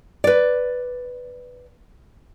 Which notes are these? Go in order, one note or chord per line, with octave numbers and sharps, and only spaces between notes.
B4 D5